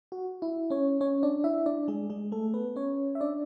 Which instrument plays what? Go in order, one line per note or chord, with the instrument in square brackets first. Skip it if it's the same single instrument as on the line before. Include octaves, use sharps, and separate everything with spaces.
[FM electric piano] F#4
E4
C#4 C#5
C#4 C#5
D4 D5
E4 E5
D4 D5
G#3 G#4
G#3 G#4
A3 A4
B3 B4
C#4 C#5
E5
D4 D5